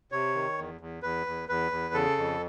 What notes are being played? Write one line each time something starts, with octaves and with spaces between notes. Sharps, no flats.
C3 C#5
D#3
E2
E2
E2 B4
E2
E2 B4
E2
C#3 A4
F2